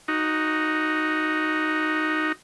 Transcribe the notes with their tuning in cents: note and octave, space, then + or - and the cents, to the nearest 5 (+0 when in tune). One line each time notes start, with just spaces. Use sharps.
D#4 +0 F#4 +0